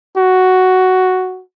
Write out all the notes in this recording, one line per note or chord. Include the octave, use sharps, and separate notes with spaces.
F#4